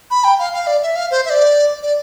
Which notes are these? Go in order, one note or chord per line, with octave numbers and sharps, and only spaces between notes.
B5
G5
F5
F5
D5
E5
F5
C5
E5
D5
D5